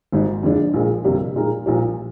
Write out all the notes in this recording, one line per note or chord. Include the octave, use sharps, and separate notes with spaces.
G#1 G#2 G3
F2 D3 F3 G#3 D4
A#1 A#2 G#3
G1 F2 C3 G3 A#3
A#2 G#3 D#4 A#4
A#1 A#2 G3